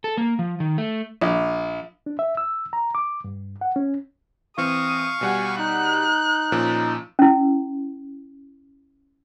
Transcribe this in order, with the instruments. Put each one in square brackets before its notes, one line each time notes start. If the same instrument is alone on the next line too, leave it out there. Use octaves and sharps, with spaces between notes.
[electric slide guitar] A4
A#3
F3
D#3
A3
[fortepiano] A#1
[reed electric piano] D4
E5
E6
A#5
D6
G2
F#5
C#4
[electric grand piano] E3 C4 [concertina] F5 C#6 [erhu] D#6
[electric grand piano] B2 G3 F#5 [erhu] G#5
[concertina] D#4 [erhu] F#6
[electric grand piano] A#2 F3 C#4
[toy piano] C#4 E4